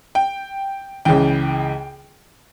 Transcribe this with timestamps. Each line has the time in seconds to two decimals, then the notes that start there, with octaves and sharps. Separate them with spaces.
0.15 G5
1.05 C#2 C#3 E3 G5